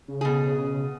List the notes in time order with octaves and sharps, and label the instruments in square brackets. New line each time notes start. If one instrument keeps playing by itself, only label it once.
[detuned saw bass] C#3
[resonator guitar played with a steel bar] B2 G#4